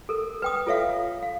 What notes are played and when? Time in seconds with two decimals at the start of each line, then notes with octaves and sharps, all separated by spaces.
0.09 A4 A#4
0.42 B4 G5 D#6
0.67 F4 A4 C#5 E5 F5
1.23 F5